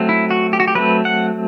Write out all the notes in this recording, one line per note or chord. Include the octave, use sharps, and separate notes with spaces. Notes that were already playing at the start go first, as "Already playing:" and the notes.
Already playing: F#3 A3 C4
E4
F#4
G4
F#4
G4
F#3 A3 C4 B4
F#5